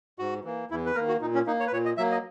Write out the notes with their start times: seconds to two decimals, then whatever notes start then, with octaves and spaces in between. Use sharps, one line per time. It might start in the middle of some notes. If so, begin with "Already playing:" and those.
0.19 G#2 F#4
0.44 E3 A#3
0.71 E2 E4
0.86 B4
0.95 D#3 A#3 A#4
1.08 F#4
1.21 A#2 D#4
1.34 C#4
1.46 A#3 D#4
1.60 C#5
1.67 B4
1.72 A#2 C#5
1.85 D#5
1.97 F#3 A#3 E5
2.11 D#5